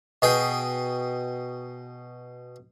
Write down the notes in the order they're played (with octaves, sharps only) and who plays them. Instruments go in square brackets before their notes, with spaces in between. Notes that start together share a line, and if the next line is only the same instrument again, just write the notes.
[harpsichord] B2 G#4 G5